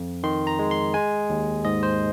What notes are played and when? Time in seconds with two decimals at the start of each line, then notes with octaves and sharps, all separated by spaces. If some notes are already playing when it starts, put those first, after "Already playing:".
Already playing: F2
0.23 D#3 C6
0.47 A#5
0.59 G#3
0.71 C6
0.94 G#3 G#5
1.30 D#2
1.65 G#2 D#5
1.83 C5